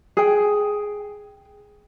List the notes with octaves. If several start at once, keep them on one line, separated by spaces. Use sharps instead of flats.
G#4 G5